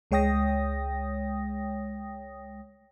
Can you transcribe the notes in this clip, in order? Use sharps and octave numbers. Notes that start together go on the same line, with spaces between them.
C#2 G#3 C#5 G5 D#6 A#6